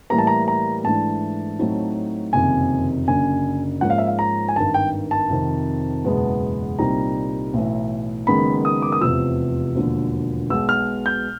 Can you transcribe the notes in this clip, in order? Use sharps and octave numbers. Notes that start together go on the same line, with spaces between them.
A2 E3 G3 A#3 A#5
A5
A#5
A#5
G#2 E3 A3 D4 A5
A2 F#3 A3 C4 D#4
F#1 F2 C3 D#3 G#5
F#1 F#2 D3 G#5
G#2 F3 A#3 C#4 F#5
F5
E5
F5
A#5
G#5
G#1 G2 D#3 A5
G5
A5
F2 C3 D#3
F#1 E2 B2 G#3 B3
C2 A#2 G3 C4 D#4 A#5
B1 A2 E3
F#1 F#2 D#3 G#3 B3 B5
D#6
D6
D#6
F1 E2 C3 F3 E6
E1 D#2 D3 F3
B1 B2 G#3 E6
F6
G6